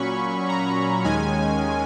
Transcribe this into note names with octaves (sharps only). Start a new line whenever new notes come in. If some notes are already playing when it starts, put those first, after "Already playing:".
Already playing: A#2 F#3 C#4 B5 C#6
A#5
D#2 D#3 G#3 C#4 G#5